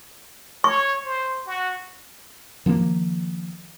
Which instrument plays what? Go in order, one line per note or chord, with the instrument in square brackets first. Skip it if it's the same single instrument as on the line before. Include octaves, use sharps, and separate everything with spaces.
[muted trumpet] C#5 [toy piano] C#6
[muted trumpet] C5
F#4
[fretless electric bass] D#3 F3 G#3 A#3